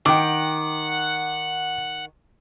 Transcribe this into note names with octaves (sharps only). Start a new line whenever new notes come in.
D#3 F#5 G5 D6